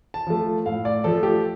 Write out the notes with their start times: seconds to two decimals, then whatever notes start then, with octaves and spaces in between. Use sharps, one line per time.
0.14 A5
0.27 F3 A3
0.66 A2 F5
0.85 D5
1.04 F3 A3 A4
1.23 G4